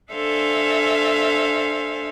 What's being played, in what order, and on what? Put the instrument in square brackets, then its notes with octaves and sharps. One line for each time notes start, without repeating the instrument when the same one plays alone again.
[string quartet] D4 A4 C5 E5 F5 G#5